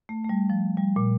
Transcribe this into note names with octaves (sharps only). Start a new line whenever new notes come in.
A3
A3
G3
F3
G3
A#2